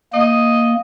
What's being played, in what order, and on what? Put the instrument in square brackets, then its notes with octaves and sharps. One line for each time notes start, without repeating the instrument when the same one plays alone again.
[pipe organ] A#3 [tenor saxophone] D#5